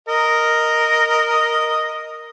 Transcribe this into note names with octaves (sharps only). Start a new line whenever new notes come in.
A#4 D#5